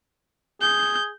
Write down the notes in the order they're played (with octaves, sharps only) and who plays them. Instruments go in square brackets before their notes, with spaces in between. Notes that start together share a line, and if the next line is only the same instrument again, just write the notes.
[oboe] G#4 [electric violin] G6